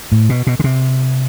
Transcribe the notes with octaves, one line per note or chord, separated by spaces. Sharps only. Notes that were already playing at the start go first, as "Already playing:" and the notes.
A2
B2
B2
D3
C3